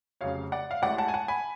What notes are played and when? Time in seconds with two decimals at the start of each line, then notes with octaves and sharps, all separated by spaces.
0.21 F1 F2 C#3 F#3 C#5 F5
0.52 D5 F#5
0.71 F5
0.82 A1 A2 G#3 D5 F#5
0.98 F#5 A5
1.08 G#5
1.14 F#5 A5
1.28 G#5 B5